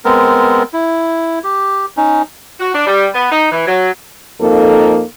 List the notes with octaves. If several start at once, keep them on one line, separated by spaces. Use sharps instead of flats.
G#3 B3 C4 A#4
E4
G4
C#4 D#4
F#4
D4
G3
B3
D#4
E3
F#3
F2 A#3 D#4 A4 A#4